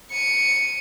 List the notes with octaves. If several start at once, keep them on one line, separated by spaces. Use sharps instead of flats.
C#7 D#7